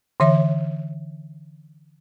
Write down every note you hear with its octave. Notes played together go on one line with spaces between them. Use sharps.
D3 E3 C#5 E5